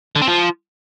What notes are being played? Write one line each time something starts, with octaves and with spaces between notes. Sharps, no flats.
D3
C4
F3